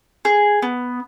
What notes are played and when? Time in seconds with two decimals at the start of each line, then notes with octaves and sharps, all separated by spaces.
0.25 G#4
0.62 B3